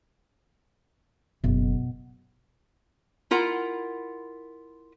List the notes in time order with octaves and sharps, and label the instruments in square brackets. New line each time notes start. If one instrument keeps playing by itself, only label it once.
[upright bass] F#1 [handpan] B2
[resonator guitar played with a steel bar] E4 F4 A#4 F#5